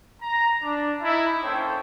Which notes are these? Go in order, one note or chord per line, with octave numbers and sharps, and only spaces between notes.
A#5
D4
D#4 E4
A#3 C#4 A4 C5 C#5 G5